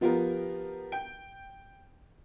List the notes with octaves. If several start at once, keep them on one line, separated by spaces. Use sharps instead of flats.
F3 B3 F4 G4 A#4
G5